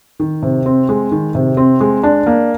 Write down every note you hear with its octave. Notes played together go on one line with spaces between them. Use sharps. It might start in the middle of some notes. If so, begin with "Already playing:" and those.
D#3
C3
C4
G#3
D#3
C3
C4
G#3
D4
A#3